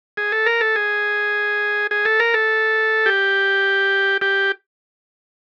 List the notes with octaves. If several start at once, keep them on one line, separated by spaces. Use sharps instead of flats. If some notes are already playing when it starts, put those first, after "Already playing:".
G#4
A4
A#4
A4
G#4
G#4
A4
A#4
A4
G4
G4